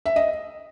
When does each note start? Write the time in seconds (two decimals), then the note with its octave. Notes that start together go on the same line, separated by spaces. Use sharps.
0.06 E5
0.16 D#5